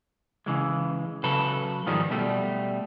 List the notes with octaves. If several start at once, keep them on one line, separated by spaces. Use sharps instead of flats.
C#3 E3 G#3
C#3 F#3 A4 B4
G#2 D#3 F3 G3 G#3
B2 G3 A3